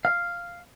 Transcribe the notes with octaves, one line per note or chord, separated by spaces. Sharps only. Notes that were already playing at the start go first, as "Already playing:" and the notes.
F5